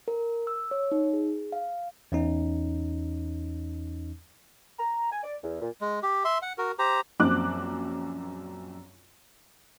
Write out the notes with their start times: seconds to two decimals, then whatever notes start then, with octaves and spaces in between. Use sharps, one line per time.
0.08 A#4
0.47 E6
0.71 C#5
0.92 D#4
1.13 G#4
1.52 F5
2.12 E2 C#4 D#4
4.79 A#5
5.12 G#5
5.23 D5
5.43 E2
5.61 A#2
5.81 G#3
6.03 G4
6.25 E5 C6
6.42 F#5
6.58 F#4 A#4
6.79 G4 C5 A#5
7.20 A#1 F#2 C4 D6 F#6